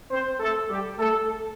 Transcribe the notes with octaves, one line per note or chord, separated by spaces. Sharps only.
C4 C5
A3 A4
G3 G4
A3 A4